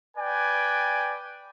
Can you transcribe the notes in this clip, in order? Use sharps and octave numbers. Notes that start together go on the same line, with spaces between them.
B4 D5 G5 G#5